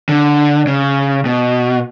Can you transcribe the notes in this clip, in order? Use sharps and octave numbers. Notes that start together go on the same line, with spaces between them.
D3
C#3
B2